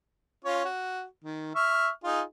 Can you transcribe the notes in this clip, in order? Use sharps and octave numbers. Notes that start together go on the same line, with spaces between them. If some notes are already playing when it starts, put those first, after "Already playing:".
C#4 F4 C#5
F#4
D#3
E5 C#6 F6
D#4 F4 G#4